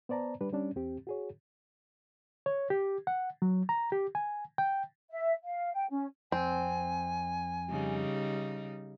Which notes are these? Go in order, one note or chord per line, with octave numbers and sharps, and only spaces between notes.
B3 C5 D5 A5 A#5
G3 D4 B4
G3 C#4 D4
E2 C4 G4
F#4 G#4 C#5
C#5
G4
F#5
F#3
A#5
G4
G#5
G5
E5
F5
G5
C#4
F2 C4 G#5
C#3 G3 D#4